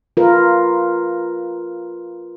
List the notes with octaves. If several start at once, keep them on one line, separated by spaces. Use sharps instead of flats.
F4 A#4 B4